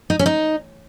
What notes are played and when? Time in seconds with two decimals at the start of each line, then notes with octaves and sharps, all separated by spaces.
0.10 D#4
0.19 C#4
0.26 D#4